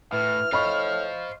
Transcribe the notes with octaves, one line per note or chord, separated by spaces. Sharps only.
A2 E3 F6
A2 C5 D#5 F5 B5 C#6